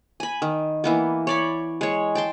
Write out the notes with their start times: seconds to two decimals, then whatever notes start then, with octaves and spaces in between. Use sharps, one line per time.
0.20 G#5 B5
0.42 D#3
0.84 E3 A#3 B3
1.27 C#5 D5 B5
1.81 G#3 C#5
2.15 G5 A5 C6